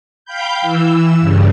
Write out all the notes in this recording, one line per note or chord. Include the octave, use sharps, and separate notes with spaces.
F5 G5 B5 G6
E3 E6
G2 C#3